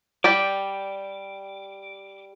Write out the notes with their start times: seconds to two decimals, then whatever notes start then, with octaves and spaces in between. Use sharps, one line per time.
0.24 G3 G4 D5 D6